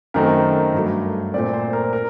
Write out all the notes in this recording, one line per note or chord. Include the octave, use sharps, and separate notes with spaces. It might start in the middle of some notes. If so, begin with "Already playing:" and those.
F#2 D#3 A3 C4 A#4
G2 F#3 A3
A#2 A3 C4 D5
C5
A#4
A#4